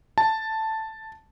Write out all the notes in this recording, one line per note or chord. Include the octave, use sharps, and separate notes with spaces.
A5